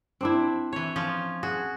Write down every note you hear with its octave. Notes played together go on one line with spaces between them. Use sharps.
C4 D4 E4
E3 C#5
F3 C#4
F#4 G#4